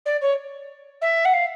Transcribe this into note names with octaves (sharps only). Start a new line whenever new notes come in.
D5
C#5
E5
F#5
F5